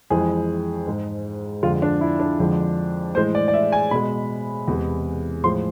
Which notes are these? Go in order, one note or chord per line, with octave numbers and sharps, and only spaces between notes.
F2 E3 G#3 G#4
G#2 G#3
F2 D3 G#3 F4
D4
E4
D4
F2 D3 F3 G#3
A2 E3 G#3 C5
D5
D5
E5
G#5
B2 G#3 B5
E2 C3 E3 G#3
A2 F3 G#3 C6